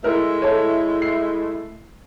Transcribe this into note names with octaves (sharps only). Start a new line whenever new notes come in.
G#3 A3 E4 A#4
A4 C#5
C7